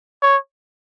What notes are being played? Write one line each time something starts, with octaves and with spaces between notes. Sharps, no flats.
C#5